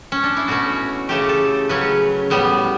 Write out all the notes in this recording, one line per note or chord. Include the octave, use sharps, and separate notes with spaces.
C#4
D4
E4
B2 A3 C#4 F#4
C#3 E3 A3 C#4 G4
A4
C#3 F#3 C#4 B4
A2 G3 B3